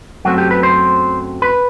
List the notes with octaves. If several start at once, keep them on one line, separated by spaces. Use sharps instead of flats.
F#2 F#3 A3 C4 F#4
G4
B4
C5
B4